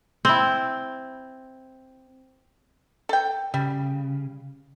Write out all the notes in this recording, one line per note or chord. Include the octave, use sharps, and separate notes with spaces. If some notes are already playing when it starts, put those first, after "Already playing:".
C4 E4
A4 G5
C#3 G3